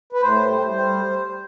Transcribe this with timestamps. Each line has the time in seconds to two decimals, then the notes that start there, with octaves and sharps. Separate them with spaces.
0.13 B4
0.21 A2 C5
0.45 G3
0.67 G3 C5